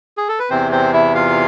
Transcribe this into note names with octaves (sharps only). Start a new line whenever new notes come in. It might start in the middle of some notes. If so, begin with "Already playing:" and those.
G#4
A4
B4
E2 C3 E3 C4 C5
C4 C5
E4 E5
F4 F5